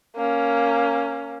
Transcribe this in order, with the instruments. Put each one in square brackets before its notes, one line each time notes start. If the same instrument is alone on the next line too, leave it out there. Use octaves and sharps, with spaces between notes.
[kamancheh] A#3 C#4